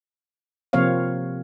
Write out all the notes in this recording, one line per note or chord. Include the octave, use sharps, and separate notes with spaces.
C3 F3 A#3 C4 C#5 F5